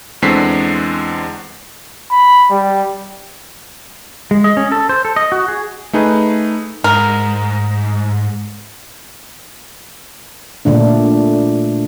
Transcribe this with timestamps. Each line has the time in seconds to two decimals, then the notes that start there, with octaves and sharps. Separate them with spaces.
0.22 E2 D3 G#3 C4 B6 C7
2.10 B5
2.50 G3
4.31 G#3
4.44 D#5
4.57 C#4
4.72 A4
4.89 C5
5.05 A4
5.16 D#5
5.32 F#4
5.48 G#4
5.93 A3 D#4 G#4 B4
6.84 G#2 A#4
10.65 A#2 D3 A3 D4